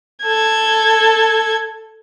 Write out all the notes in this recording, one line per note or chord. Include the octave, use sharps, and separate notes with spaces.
A4 G#6